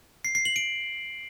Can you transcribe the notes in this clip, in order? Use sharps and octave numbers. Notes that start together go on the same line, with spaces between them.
C7
C7
F#7
D7